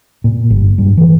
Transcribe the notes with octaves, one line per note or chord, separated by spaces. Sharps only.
A#2
G1
G2
E3